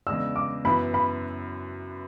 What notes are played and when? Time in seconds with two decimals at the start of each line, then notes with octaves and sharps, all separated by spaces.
0.07 E2 C#3 G#3 D4 E6
0.36 D6
0.65 F#2 E3 B3 E4 B5
0.94 B5